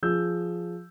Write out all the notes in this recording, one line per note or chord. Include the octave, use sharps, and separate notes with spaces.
F3 G#4 E6 G6